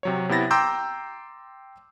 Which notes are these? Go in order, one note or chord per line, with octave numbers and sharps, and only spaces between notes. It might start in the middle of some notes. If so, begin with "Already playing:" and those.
C3 F#3 C#5
C3 B3 E4 A6 A#6
G5 A#5 C6 D6 E6 G6